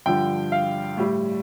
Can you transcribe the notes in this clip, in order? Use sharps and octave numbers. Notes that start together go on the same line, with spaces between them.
G2 D3 F3 G5
F5
A2 G3